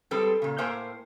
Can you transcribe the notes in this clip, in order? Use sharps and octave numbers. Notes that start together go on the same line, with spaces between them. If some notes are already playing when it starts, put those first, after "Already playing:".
G3 G#3 C4 A4 B4
A#2 C#3
A2 A#3 A#4 C5 G5 G#5